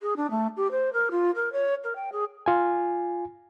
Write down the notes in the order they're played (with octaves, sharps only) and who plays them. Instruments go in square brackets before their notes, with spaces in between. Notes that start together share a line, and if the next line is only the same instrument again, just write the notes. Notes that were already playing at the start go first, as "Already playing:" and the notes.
[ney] G#4
D4
A3
G4
C5
A#4
F4
A#4
C#5
A#4
G5
G#4
[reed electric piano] F4 G#5